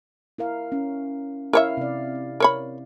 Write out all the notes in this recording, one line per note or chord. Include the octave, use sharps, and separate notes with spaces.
E4 A#4 F5
C#4
E4 A#4 C#5 E5 F5
C3 D5
A#4 C#5 B5